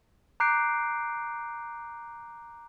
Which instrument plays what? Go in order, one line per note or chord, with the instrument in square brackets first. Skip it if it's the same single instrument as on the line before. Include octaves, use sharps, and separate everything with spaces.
[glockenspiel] A#5 D6 F#6 G6 C7 D7